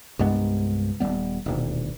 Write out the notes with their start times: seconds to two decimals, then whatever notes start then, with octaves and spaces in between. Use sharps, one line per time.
0.19 C2 G2 G#3 B3
1.00 D#1 G#2 G3 B3
1.46 D#1 D2 B2